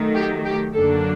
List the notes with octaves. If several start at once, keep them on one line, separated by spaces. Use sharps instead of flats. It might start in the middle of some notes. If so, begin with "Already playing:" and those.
Already playing: D#3 F#3 A3
G4
G4
F#2 D3 F#3 A#3 D4 A4